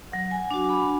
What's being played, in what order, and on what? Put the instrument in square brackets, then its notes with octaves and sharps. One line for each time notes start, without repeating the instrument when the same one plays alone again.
[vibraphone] F#3 F#5
G#5
D4 F#4 D6
B5